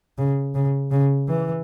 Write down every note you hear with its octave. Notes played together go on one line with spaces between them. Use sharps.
C#3
C#3
C#3
E3